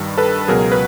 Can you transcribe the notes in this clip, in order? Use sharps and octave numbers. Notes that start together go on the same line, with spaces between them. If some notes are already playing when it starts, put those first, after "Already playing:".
Already playing: G2 D#3 G3
A4 B4
C#2 B2 F#3 G#4 A#4
B4